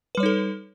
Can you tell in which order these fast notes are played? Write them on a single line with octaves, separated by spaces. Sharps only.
B4 G3 C#5 D#4 A4